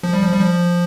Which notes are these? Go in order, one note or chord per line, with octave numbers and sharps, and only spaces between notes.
F3
G3
F3
G3
F3